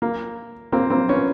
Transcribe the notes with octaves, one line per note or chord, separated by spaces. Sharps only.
A#3
A#3 C4
A#3 C4
B3 C#4